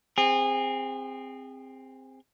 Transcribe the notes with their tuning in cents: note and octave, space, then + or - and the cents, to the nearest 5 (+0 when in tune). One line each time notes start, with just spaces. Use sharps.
C4 +0 G#4 -30